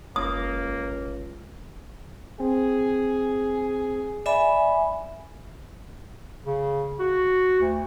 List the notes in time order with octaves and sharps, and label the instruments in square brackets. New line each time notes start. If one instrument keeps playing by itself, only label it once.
[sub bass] F#1 [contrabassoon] C#2 [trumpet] A#3 [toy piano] D#6
[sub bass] G#1
[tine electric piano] C4 [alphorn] G#4
[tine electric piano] D5 [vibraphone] E5 G#5 B5
[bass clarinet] C#3
F#4
D2